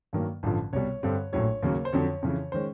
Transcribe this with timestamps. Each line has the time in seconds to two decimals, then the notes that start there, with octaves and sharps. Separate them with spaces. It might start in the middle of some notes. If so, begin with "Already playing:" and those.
0.13 G2 D#3 F#3 A#3
0.43 A1 G2 D3 F3
0.73 C2 B2 G3 C#5
1.03 G2 D3 G3 C4
1.32 A#1 A2 F#3 C#5
1.63 D#2 C#3 F#3 A#3
1.85 C5
1.93 F2 D3 F#3 C#5
2.22 F2 C#3 E3
2.52 D#3 G#3 C#4 C5